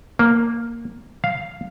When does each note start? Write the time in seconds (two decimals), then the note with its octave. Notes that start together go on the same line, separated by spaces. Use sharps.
0.19 A#3
1.24 F5